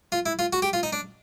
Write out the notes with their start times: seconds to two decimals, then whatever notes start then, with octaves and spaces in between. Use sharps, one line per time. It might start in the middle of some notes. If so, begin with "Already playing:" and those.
0.12 F4
0.26 E4
0.39 F4
0.53 F#4
0.62 G4
0.73 F4
0.83 D#4
0.93 D4